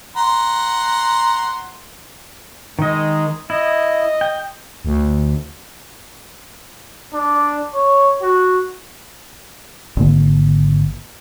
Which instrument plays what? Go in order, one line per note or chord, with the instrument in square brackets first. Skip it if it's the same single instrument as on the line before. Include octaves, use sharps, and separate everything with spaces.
[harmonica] F#5 A#5 C6
[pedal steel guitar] D#3 D#5 [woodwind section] G#3
[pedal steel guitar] E4 [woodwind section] D#5
[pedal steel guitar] G5
[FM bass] D2
[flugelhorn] D4
C#5
F#4
[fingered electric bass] G#1 D3 A#3